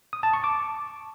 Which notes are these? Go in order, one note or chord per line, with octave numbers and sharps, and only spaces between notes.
D#6
A5
C#6
D6